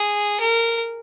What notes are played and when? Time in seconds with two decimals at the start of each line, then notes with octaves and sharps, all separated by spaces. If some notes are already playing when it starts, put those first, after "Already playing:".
Already playing: G#4
0.40 A#4